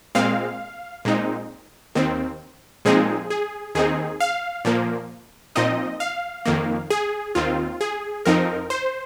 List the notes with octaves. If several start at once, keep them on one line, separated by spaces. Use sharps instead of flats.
A#2 G#3 C4 F5
A#2 G#3 C4 D#4
D#2 D#3 C4
A#2 F3 G#3 C4 D#4 G#4
G#4
D#2 D#3 C4 D#4 G#4
F5
A#2 F3 A#3
A#2 F3 C4 D#4 D#5
F5
F2 D#3 A#3
G#4
D#2 D#3 C4 F4
G#4
F2 F3 C4 D#4 A#4
C5